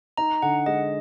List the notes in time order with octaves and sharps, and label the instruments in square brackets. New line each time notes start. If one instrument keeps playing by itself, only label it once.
[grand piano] D#4 [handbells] A#5
[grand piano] D3 [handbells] F#5
[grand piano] G#3 [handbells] D#5